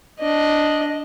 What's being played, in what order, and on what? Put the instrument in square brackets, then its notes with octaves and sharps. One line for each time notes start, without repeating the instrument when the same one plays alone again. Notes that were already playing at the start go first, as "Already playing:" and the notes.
[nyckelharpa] D4 D#5